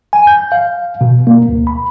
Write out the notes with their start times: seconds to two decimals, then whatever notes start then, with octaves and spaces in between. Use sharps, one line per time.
0.13 G#5
0.27 G6
0.52 F5
1.01 B2
1.27 A#3
1.48 D2
1.67 B5